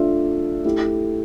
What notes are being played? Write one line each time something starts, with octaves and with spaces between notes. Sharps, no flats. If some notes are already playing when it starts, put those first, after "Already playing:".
Already playing: A3 D4 F4 E5
A3 E4 G4